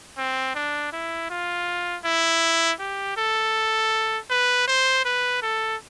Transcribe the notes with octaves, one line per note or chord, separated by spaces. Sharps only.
C4
D4
E4
F4
E4
G4
A4
B4
C5
B4
A4